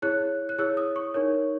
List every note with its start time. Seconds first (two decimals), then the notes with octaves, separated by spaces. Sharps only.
0.02 E4 G#4 C#5 F#6
0.49 F#6
0.58 E4 G#4 C#5 E6
0.77 D#6
0.96 C#6
1.14 D#4 A#4 C#5